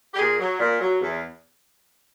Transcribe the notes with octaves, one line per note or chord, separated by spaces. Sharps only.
G4
A#2 G#4
F#3
A#2
F#3
E2